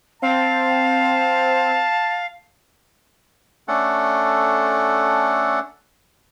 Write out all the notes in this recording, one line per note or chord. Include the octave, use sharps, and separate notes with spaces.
C4 F5 A5
A3 C#4 D4 A4 F#5